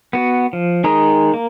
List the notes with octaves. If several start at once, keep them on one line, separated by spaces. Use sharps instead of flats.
B3 F#4
F3
D#3 G#3 A#5 D#6
A#3